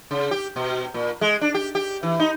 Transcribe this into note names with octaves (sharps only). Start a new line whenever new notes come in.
C#3
G4
B2
A#2
G#3
D4
G4
G4
E3
D#4